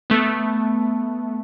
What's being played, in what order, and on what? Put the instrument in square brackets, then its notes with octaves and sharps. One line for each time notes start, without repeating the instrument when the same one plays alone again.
[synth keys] A3 B3